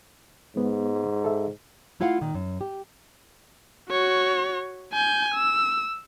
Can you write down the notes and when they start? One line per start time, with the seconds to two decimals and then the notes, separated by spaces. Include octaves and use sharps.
0.56 G#2 G#3 B3
1.24 A4 E5
2.00 A3 E4 F4 F5 F#5
2.21 A#2 D#3
2.34 F#2
2.61 G4
3.90 F#4 C#5
4.93 G#5 G6
5.34 E6